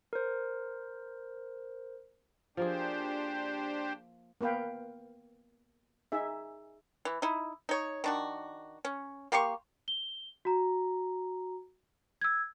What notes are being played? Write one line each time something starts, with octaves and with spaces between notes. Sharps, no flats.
A#4 C5
F3 A#3 D4 G4 G#4 C5
A#3 B3 B4 F5 G5
D#4 G#4 E5
E3
D#4 E4
D#4 C#5
D#3 D4 F#4
C#4
A#3 G4 C6 C#6
G7
F#4 A#5
E6 G#6